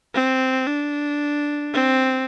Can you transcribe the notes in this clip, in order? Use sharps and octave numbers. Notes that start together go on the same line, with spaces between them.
C4
D4
C4